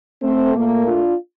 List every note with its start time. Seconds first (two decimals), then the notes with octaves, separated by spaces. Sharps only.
0.23 A3 C4
0.55 A#2 A3 A#3
0.87 D4 F4